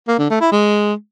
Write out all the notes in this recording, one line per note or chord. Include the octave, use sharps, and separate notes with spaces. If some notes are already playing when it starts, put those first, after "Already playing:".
A#3
D3
A3
E4
G#3